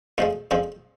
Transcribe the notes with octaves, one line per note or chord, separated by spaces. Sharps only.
F2 D3 F3 G#3 A3
F2 D3 F3 G#3 C4